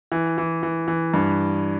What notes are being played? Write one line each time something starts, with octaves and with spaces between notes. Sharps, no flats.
E3
E3
E3
E3
G2